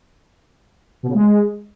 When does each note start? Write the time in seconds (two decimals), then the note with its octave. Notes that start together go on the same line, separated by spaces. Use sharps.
1.03 B2
1.09 C#3
1.14 G#3